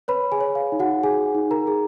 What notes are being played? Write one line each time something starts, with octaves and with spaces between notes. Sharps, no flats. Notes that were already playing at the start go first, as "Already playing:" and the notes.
B4 C#5 B5
G#4 G#5
C#5
F5
D#4
F#4 F#5
G#4 G#5
D#4
A#4 A#5
G#4